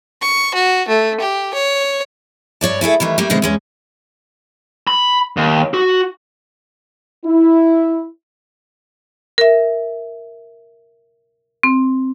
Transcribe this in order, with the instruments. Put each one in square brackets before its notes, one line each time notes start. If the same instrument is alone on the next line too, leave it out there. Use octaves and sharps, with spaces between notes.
[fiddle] C#6
F#4
A3
G4
C#5
[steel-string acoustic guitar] G2 C#5 D5 A5
A3 E4 G#4 A4
D#3 E3 G3 A3
G3 A3 A#3
B2 D3 D#3 G#3 C4 D#4
E2 G#3 C#4
[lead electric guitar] B5
D#2
F#4
[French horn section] E4
[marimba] A#4 E5
C4